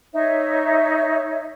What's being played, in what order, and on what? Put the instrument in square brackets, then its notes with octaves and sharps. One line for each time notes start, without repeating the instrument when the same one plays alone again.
[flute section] D#4 C#5 E5